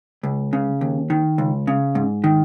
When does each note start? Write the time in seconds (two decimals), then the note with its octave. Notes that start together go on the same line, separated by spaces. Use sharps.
0.23 C#2
0.53 C#3
0.81 D#2
1.10 D#3
1.38 C#2
1.67 C#3
1.95 G#2
2.24 D#3